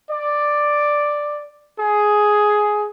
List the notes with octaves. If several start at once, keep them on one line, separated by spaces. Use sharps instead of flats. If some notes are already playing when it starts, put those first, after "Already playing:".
D5
G#4